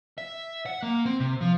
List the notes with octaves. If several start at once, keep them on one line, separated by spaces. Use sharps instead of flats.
E5
F#5
A#3
C4
C3
F3